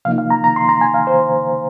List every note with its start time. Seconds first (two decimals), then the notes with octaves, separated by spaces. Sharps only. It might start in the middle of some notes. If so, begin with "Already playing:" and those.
0.05 C3 F3 A#3 D#4 F5
0.18 F5
0.30 A#5
0.44 A#5
0.56 C6
0.69 A#5
0.81 G#5
0.94 F5
1.07 C5